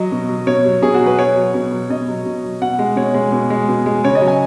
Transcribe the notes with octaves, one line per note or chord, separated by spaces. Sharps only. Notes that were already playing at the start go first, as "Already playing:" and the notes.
Already playing: F#3 D#5
B2
F#3
B2 C#5
F#3
B2 G#4
F#4
F#3
B4
B2 C#5
F#3
B2
F#3
B2 D#5
F#3
B2
F#3
B2 F#5
G#3
B2 C#5
G#3
B2
G#3
B2
G#3
C#3 C#5
D#5
F#3
G#5